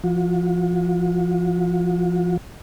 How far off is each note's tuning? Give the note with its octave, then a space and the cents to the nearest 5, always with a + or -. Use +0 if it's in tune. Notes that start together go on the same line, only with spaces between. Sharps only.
F3 -20 F#4 -45